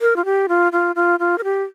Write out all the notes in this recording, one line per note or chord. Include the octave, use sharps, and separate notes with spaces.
A#4
F4
G4
F4
F4
F4
F4
A#4
G4